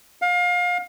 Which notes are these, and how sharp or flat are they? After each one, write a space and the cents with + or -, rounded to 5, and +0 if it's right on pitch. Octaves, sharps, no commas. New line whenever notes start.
F5 +30